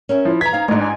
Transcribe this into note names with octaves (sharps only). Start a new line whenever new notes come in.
C#4 A#4 E5
F3 E4
E3 A#5 G#6 B6
C4 D#4 F5
A1 G#2 A3 D4 D#4
G#5